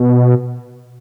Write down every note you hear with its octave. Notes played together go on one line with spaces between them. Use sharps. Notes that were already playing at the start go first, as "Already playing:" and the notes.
Already playing: B2